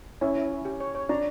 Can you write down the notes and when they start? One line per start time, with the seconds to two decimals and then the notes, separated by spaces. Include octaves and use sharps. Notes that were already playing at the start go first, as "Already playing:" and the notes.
0.21 C#4 E4
0.37 E4
0.52 E4
0.65 G4
0.80 C#5
0.95 C#5
1.09 D4 A#5